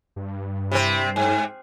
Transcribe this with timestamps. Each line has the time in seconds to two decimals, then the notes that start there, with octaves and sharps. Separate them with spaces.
0.16 G2
0.72 C3 C4 E4
1.16 G#2 G#5